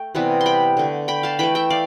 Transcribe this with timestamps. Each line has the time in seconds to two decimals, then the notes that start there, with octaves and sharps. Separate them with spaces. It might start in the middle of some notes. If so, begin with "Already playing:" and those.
Already playing: A3 G5
0.15 C3 E3 G3 B3
0.41 C6
0.46 G5 B5
0.77 D3 A3
1.08 G5 B5
1.23 F5 A5
1.39 E3 A3 G5 B5
1.55 E5 G5
1.70 D5 F5